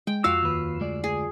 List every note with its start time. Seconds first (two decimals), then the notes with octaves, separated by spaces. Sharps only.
0.07 G#3 G5
0.24 F2 F4 F#4 F5 E6 C7
0.43 D#2 B4
0.80 D2 G#3 D5
1.04 G#4